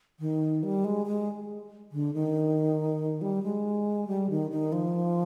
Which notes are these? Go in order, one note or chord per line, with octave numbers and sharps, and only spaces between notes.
D#3
G3
G#3
G#3
D3
D#3
G3
G#3
G3
D#3
D#3
F3